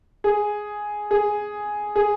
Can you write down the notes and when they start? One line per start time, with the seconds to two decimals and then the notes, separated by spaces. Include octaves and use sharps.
0.24 G#4
1.11 G#4
1.96 G#4